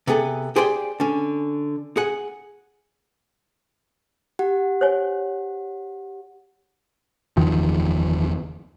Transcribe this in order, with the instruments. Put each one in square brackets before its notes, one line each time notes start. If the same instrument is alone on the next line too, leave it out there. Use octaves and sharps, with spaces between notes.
[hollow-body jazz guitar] C3 B3 G#4 A4
G4 G#4 C5 D5 F#5 G5
D3 C#4
G#4 F#5
[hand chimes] G4 F#5
[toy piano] C5 C#5 G#5
[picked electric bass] F#1 E2 D#3 F3